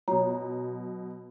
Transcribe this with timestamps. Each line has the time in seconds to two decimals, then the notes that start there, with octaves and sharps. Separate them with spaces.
0.08 B2 F#3 C#5 A#5